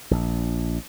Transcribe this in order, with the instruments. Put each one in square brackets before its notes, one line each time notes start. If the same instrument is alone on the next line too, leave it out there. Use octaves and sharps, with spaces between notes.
[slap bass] A#1